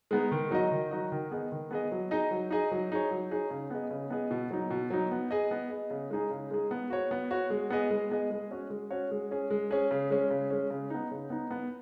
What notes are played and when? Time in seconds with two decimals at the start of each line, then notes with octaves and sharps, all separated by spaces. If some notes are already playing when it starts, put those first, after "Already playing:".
0.11 G#3 B3 D#4
0.32 D#3
0.51 F#3 D#4 F#4 D#5
0.71 D#3
0.91 F#3 D#4 F#4 D#5
1.12 D#3
1.31 B3 G#4 D#5
1.52 D#3
1.71 B3 G#4 D#5
1.91 F#3
2.11 D#4 G#4 D#5
2.31 F#3
2.51 D#4 G#4 D#5
2.71 F#3
2.92 D#4 G#4 C#5
3.11 F#3
3.31 D#4 G#4 C#5
3.50 C#3
3.70 B3 G#4 D#5
3.90 C#3
4.10 B3 G#4 D#5
4.31 B2
4.51 F#3 D#4
4.70 B2
4.90 F#3 D#4
5.11 B3
5.31 G#4 D#5
5.51 B3
5.70 G#4 D#5
5.90 C#3
6.10 G#3 D#4 G#4
6.30 C#3
6.51 G#3 D#4 G#4
6.71 B3
6.90 F#4 C#5
7.11 B3
7.31 F#4 C#5
7.50 G#3
7.70 B3 G#4 D#5
7.90 G#3
8.11 B3 G#4 D#5
8.30 G#3
8.51 C#4 F#4 C#5
8.70 G#3
8.90 C#4 F#4 C#5
9.11 G#3
9.31 C#4 G#4
9.50 G#3
9.71 C#4 G#4
9.91 C#3
10.10 G#3 C#4
10.30 C#3
10.50 G#3 C#4
10.70 C#3
10.90 B3 D#4
11.11 C#3
11.30 B3 D#4
11.51 B3